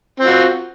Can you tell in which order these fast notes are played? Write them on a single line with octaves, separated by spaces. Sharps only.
C4 F4 F#4